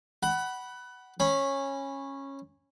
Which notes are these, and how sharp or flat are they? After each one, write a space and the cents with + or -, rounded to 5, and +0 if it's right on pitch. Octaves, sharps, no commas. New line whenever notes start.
F#5 +20 B5 -10
C#4 -15 B5 +0